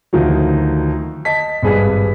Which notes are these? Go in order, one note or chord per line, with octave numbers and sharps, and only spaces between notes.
D2 D#3 F3 F#3
D#5 A5 B6
G#1 G2 G#4 B4 B6